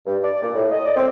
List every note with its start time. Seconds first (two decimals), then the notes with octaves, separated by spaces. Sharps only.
0.06 G2
0.23 D5
0.42 A#2
0.55 A2
0.71 D#5
0.85 D5
0.96 C4